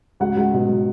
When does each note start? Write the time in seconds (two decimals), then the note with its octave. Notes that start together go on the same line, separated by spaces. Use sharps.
0.20 C#2 F#4 F#5
0.36 C#2
0.54 B2
0.69 B2